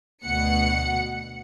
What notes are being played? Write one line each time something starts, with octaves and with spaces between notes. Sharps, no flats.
D2 B2 F#5 C#7